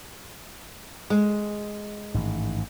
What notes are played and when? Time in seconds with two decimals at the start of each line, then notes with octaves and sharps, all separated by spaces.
1.10 G#3
2.14 A1 G#2 D#3